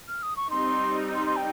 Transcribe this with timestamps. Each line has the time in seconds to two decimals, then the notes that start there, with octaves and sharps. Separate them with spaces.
0.08 F6
0.23 D#6
0.37 C#6
0.50 G3 C4 D#4 C6
1.15 C6
1.26 C6
1.37 G5